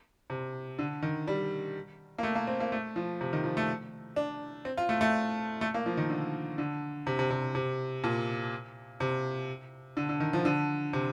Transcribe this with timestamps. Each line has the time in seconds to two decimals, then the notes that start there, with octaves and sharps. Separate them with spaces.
0.30 C3
0.79 D3
1.02 D#3
1.28 G3
2.18 A#3
2.23 A3
2.36 A#3
2.47 C4
2.60 A#3
2.72 A3
2.96 F3
3.21 C3
3.33 D#3
3.44 F3
3.57 A3
4.16 D4
4.65 C4
4.77 F4
4.89 A3
5.01 A3
5.61 A3
5.74 A#3
5.86 F3
5.97 D#3
6.09 D3
6.58 D3
7.07 C3
7.19 C3
7.30 C3
7.55 C3
8.04 A#2
9.00 C3
9.97 D3
10.09 D3
10.20 D#3
10.33 F3
10.45 D3
10.93 C3